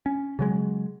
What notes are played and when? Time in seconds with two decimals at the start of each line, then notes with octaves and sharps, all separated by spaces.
0.06 C#4
0.39 C#3 F#3 G#3